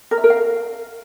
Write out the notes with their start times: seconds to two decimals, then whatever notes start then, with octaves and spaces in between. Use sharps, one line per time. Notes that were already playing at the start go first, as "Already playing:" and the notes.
0.11 A#4
0.18 E5
0.24 A#4
0.30 F5